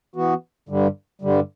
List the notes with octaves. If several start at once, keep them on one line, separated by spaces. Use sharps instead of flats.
E3 B3 F#4
G2 D3 G3
G2 D3 G3